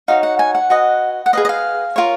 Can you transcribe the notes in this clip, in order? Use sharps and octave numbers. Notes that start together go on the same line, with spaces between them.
D#4 F#4 C#5 F5
F#5
G#5
F#5
F#4 B4 D#5
F#5
G#4 B4 D#5 F5
D#5
F5
F4 A#4 C#5